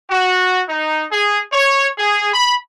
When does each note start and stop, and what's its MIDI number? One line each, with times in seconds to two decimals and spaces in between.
0.10 0.62 66
0.69 1.06 63
1.12 1.42 68
1.53 1.88 73
1.98 2.33 68
2.34 2.56 83